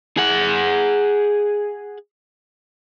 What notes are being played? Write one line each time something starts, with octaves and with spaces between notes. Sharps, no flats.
G#4 F#5